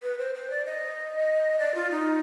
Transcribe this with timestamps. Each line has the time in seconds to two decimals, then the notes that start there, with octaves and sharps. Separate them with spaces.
0.03 B4
0.18 C5
0.35 C5
0.50 D5
0.66 D#5
1.59 D5
1.75 F4
1.91 D#4